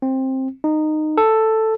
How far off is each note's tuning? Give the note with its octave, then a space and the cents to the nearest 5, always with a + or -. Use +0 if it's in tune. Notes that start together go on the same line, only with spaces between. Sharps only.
C4 +15
D#4 -15
A4 +5